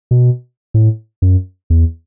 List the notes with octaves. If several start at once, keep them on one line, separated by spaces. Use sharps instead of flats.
B2
A2
F#2
E2